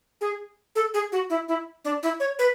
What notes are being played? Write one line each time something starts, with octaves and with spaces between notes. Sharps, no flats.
G#4
A4
G#4
F#4
E4
E4
D4
E4
C#5
B4